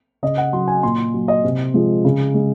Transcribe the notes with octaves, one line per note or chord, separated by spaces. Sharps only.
C#3 D#5
F#5
F#3 C6
G#5
A#2 C6
F#3
D#5
C3
F3 G#3
C#3
G#3